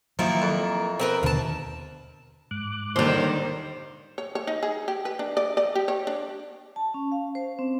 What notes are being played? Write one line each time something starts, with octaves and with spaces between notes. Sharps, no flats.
D#3 F3 F#3 A#3 E4
F2
C4 A#4 B4
D#2 B2 D3 F5 A5
G#2 D6 F#6
D#2 D3 D#3 G3 C5
C#5
C#5
D#4
G#4
G4
B4
D4
D5
D5
G4
C#5
D4
A5
C#4
F5
C5
C4